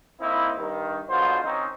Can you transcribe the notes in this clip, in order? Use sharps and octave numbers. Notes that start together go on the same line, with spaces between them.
A#3 C4 D#4 E4
G2 D#3
D3 F#3 G#3 B3 F4 C5
D#3 C4 C#4 D#4